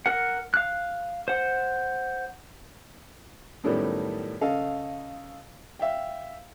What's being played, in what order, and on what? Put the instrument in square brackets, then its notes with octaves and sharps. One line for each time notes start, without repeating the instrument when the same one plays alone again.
[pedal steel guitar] A#4 F#5
F5 F#6
C5 F#5
[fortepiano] F#2 A2 D#3 G3 A3 B3
C#3 A4 D#5 F5
E5 F5 G5